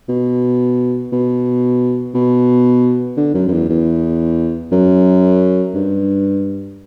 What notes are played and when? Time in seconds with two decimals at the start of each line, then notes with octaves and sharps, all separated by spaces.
0.08 B2
1.12 B2
2.14 B2
3.17 D3
3.34 F#2
3.48 F#2
3.52 E2
3.70 E2
4.72 F#2
5.74 G2